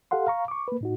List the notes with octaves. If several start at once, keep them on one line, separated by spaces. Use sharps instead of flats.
G4 A4 F5 F#5 C6
F5 A#5 C#6
C#6 D6
A#3 B4
A2 D#4 F#4